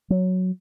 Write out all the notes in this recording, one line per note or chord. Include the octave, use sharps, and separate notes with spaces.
F#3